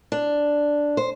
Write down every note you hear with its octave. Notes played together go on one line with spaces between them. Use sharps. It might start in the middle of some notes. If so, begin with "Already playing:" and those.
D4
C5